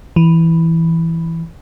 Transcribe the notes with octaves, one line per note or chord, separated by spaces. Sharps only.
E3